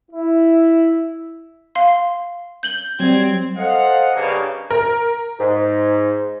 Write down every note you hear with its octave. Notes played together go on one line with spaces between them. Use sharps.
E4
F5 C6
G6 F#7 G7
F#3 G3 C4 G#6
A4 C5 D#5 F5 F#5
G2 C#3 A#3
A#4
G#2